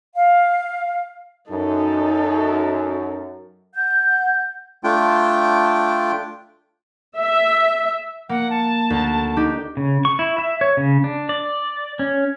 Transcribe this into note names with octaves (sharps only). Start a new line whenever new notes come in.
F5
F#2 D#4 A4
F#5 G6
A3 D4 F4 G5
E5
A#3 F#5
A5
D2
D4 D#4 G4
C#3
C#6
E4
E5
C#5
C#3
D4
D5
C#4